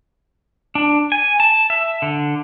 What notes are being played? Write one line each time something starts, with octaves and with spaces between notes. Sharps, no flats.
D4
G#5
A5
E5
D3